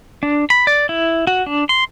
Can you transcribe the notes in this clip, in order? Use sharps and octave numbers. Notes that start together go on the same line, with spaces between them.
D4
B5
D5
E4
F#4
D4
C6